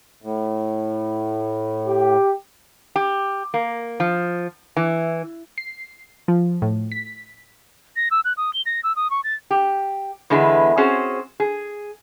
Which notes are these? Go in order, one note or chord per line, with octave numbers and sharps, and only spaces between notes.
A2
G4
G4
A#3
F3
E3
C7
F3
A2
B6
A#6
E6
F#6
D#6
G7
A#6
E6
D#6
C#6
A6
G4
E2 D3 G#3 B3 E4
C4 C#4 F#4 G#4 C5
G#4